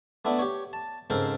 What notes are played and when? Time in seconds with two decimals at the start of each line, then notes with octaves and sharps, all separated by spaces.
0.25 A3 B3 D4 E4
0.39 G4 C#5
0.73 A5
1.10 G#2 C#3 C4 A4 A#4 C5